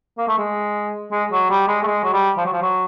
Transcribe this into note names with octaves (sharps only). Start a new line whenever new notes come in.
A#3
A3
G#3
G#3
F#3
G3
G#3
A3
G#3
F#3
G3
F3
F#3
F3
F#3